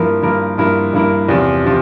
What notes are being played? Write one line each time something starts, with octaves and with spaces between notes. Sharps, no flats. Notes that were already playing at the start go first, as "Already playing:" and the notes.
Already playing: G2 F3 A#3 E4 A#4
G2 F3 A#3 E4 A#4
G2 F3 A#3 E4 A#4
G2 F3 A#3 E4 A#4
E2 C3 F3
C3 F3